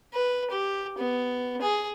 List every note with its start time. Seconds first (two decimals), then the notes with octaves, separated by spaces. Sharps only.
0.14 B4
0.51 G4
0.98 B3
1.61 G#4